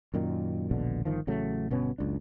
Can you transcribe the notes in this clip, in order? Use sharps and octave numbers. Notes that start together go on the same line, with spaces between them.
F#2 A#2 D#3
D#1 A#1 B2 D3
G1 D#3 F3
A1 C#3 F#3 A3
G1 B2 B3 C#4
F#1 C#2 D4